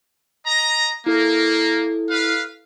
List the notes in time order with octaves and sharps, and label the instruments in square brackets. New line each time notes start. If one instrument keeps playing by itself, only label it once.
[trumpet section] D#5 A#5
[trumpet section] A#3 [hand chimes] E4 A4
[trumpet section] B4 F5